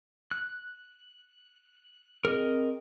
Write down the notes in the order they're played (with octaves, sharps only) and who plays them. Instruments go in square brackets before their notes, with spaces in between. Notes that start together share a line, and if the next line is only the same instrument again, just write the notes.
[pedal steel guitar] F#6
[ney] C4 [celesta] G#4 [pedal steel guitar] A#4 D#5